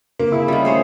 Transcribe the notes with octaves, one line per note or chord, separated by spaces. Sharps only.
C#3 A#3 C4
C#3 E4 G#4 F5
D#3 G3 C#4 F4
A3 C#4 G#4 C5 C#5